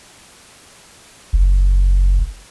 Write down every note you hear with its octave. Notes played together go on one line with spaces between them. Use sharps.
F#1